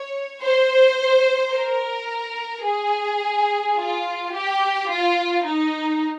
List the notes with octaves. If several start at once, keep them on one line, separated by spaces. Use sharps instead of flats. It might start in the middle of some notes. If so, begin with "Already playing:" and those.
Already playing: C#5
C5
A#4
G#4
F4
G4
F4
D#4